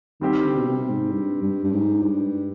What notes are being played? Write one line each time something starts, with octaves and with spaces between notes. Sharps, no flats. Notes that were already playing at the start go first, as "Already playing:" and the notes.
D#3 G3 C4 G4
D3
B2
C3
G#2
G2
G2
G2
G#2
G2